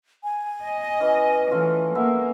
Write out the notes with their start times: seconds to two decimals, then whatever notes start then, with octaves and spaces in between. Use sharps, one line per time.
0.24 G#5
0.64 D#5
1.00 E3 C#4
1.51 E3 A3 C#4 F4
1.95 A#3 B3 A#4 E5